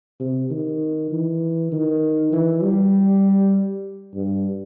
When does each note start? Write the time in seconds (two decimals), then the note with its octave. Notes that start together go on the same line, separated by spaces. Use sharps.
0.20 C3
0.50 D#3
1.11 E3
1.72 D#3
2.32 E3
2.63 G3
4.14 G2